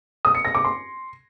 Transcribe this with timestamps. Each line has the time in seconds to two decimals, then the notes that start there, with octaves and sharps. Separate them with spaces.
0.25 D#6
0.35 C#7
0.45 A#6
0.55 D6
0.65 C6